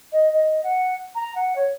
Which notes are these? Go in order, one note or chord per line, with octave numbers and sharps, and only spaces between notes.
D#5
D#5
F#5
A#5
F#5
C#5